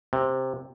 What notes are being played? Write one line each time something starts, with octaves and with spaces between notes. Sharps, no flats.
C3